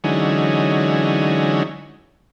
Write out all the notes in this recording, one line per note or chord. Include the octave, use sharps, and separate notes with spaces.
D3 E3 F#3 G#3 C#4 D#4